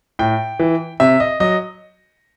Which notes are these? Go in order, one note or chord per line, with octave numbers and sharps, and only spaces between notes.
A2 G5
E3
C3 E5
D#5
F#3 D#5